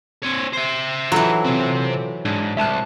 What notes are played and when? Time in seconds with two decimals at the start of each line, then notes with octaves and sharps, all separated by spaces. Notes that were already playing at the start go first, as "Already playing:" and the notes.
0.23 C4 C#5
0.53 C5 E5
1.12 E3 F#3 F4 A4
1.45 C3 C4
2.25 G#2 D4
2.57 C2 E5 A5 F#6